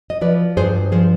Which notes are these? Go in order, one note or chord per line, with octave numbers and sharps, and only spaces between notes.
D#5
F3 B4 D5
G2 G#4 C5
F3 G#4 C5